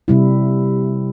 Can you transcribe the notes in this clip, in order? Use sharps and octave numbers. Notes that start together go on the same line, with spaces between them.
C3 G3 E4